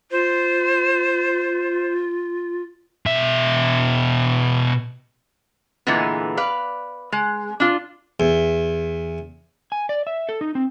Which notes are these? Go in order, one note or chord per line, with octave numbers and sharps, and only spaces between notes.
F4 C5
B2 E5
A#2 D3 E3 G#3 B3
B4 D5 F5
G#3
D4 F4
E2
G#5
D5
E5
A4
D#4
C4